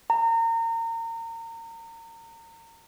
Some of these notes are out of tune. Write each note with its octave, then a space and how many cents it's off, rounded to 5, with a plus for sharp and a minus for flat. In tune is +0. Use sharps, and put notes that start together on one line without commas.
A#5 -30